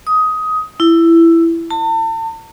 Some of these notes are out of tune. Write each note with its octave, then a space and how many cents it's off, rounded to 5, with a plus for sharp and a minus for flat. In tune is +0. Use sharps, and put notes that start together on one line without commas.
D#6 +15
E4 +15
A5 +40